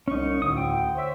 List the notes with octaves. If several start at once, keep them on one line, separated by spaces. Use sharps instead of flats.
C2 C#4 D#4 C#6
D2 A2 D3 D#6
G5
C5 C#5 E5